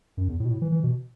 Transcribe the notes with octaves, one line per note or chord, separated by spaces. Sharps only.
F#2
E2
A2
B2
A2
E3
E3
B2